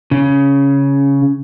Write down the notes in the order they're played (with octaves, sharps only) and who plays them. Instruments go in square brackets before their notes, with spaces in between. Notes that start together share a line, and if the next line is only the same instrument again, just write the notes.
[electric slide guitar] C#3